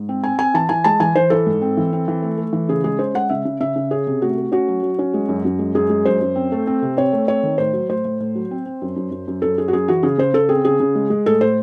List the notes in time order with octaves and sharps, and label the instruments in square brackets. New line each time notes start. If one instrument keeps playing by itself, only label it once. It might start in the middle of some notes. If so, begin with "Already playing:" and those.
Already playing: [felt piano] G#2
C4
C4 G#5
C4 G#5
E3 A5
E3 G#5
G#3 A5
E3 G#5
E3 C5
E3 A4
G#2
C4
E3
C4
E3
A3
A3
E3
C#3 G#4
G#3 G#4
C#4 C5
G#3 F#5
C#3 E5
C#3
C#3 E5
C#3
C#4 G#4
C3
A3 F#4
A3
C#4 F#4
F#3
F#3
C#4
G#3
F#2
F#2
G#3
F#2 G#4
G#3
F#2 C5
F#2
C4
A3
C4
C3
C4 C#5
A3
C4 C#5
D#3
A2 C5
F#3
A2 C5
A2
A2
F#3
C4
C4
F#2
F#2
F#2
F#2
F#2 A4
F#2 G#4
F#4
F#2 G#4
E3 F#4
C#3 G#4
C#3 C5
C#3 A4
C4 G#4
C#3 G#4
C#3
G#3
G#3
A2 A4
A2 C5